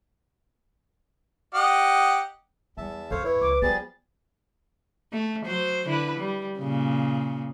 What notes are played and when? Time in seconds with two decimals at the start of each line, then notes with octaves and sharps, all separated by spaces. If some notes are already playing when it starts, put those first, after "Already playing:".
1.55 G4 D#5 F#5
2.78 E2 G3 E5 A5
3.11 F2 C4 A4 C5 C#5 F5
3.24 E4 B4 C#5
3.41 C#2 D6
3.62 F3 G3 B3 G#4 A6
5.13 A3
5.46 F#3 C5
5.87 D3 E4 B4
6.19 G3
6.59 A#2 C#3